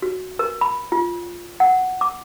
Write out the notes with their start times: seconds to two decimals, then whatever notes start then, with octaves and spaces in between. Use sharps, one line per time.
0.02 F#4
0.39 A#4
0.61 B5
0.92 F4
1.60 F#5
2.01 D6